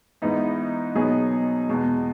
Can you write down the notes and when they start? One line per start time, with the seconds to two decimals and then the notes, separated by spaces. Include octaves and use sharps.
0.22 G#2 E3 B3 D#4
0.95 B2 F#3 B3 D#4 G#4
1.69 E2 B2 G#3